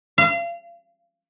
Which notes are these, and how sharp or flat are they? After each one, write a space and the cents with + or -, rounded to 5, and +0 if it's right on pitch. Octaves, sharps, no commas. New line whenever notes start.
F5 -35